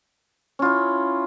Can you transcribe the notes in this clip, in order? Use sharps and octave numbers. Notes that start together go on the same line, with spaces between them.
C#4 E4 F4